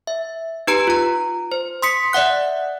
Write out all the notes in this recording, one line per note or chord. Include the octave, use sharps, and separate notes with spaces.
E5
D#4 G4 B4 A#5 D7
F4 A#5
C5
C6 D#6 B6 C#7
D5 E5 F#5 F#6